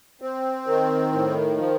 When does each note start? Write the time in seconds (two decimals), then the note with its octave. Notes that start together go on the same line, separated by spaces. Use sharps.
0.22 C4
0.67 D#3
1.12 A2
1.58 F3